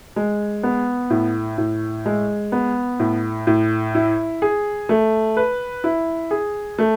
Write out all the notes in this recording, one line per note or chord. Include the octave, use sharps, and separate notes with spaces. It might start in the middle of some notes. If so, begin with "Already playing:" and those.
G#3
B3
A2
A2
G#3
B3
A2
A2
E4
G#4
A3
B4
E4
G#4
A3